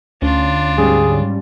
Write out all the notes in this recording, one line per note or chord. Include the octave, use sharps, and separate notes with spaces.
D2 C#4 D4 F4
G#2 G3 C#4 G#4